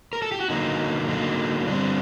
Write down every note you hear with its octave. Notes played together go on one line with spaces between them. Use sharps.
A#4
A4
G4
F#4
D3 F#3 A#3 D#4
D3 F#3 A#3
D3 G3 C4 D4